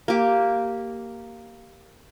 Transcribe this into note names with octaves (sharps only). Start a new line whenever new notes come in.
A#3 G4